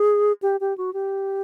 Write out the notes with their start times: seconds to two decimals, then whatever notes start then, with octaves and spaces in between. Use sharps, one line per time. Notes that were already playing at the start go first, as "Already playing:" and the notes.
Already playing: G#4
0.42 G4
0.61 G4
0.78 F#4
0.94 G4